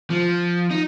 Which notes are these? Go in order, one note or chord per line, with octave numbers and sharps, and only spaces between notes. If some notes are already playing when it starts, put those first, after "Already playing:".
F3
D#4